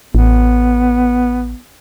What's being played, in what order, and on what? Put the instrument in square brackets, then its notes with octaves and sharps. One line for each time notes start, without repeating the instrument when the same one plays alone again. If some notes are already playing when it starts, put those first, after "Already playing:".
[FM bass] A1 [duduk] B3